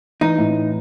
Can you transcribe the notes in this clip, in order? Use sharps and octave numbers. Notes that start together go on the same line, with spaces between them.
E3 D#4
A2